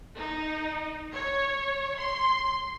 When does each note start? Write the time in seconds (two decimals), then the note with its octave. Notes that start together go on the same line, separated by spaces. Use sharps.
0.17 D#4
1.14 C#5
1.98 C6